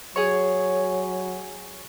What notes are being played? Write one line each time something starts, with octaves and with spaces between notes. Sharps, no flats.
F#3 G#4 C#5